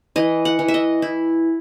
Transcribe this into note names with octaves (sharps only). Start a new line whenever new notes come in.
E3 D#5
F#5
E3
E5
D#5
E4